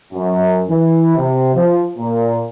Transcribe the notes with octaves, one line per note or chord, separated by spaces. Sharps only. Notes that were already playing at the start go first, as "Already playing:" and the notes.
F#2
E3
C3
F3
A#2